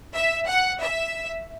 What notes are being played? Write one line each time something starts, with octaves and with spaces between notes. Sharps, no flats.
E5
F#5
E5